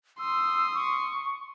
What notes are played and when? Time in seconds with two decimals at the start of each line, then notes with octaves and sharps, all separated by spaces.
0.19 C6 D#6 E6
0.74 C#6